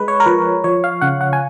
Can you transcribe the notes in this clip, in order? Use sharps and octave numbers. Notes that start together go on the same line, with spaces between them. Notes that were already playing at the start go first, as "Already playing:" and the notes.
Already playing: G#3 B4
C#5
A#4
F3 B4
F3 C#5
F5
C#3 F#5
F#5
G#5